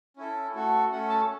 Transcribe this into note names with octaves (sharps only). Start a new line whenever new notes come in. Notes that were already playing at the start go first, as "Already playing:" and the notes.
C#4 E4 A4
A3 F#4 A4
A3 C#4 A4 F#5
A5